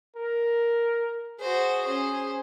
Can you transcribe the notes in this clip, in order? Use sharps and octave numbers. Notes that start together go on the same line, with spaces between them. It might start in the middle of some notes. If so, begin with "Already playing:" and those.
A#4
F#4 G#4 C5
C#4 C5